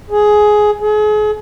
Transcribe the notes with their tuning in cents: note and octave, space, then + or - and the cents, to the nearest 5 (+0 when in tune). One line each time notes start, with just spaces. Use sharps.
G#4 +10
G#4 +35